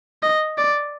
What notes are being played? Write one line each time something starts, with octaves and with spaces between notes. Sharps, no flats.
D#5
D5